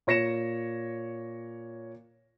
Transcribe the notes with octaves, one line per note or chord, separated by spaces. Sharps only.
A#2 C#5 A#6 C#7 E7